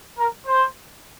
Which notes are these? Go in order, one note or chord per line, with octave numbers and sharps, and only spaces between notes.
A#4
C5